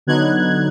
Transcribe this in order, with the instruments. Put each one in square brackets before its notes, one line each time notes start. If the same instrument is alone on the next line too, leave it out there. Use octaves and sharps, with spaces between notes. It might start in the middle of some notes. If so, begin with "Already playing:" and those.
[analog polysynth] D3 F#3 B3 D#4 F#6 G#6